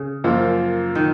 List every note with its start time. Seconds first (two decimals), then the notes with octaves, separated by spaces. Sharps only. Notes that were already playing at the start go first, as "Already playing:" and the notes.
Already playing: C#3
0.24 F#2 F3 A#3 F4 C5
0.95 D#3